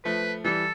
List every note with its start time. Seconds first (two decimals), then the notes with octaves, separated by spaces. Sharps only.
0.05 F3 A3 B4
0.45 E3 G3 A4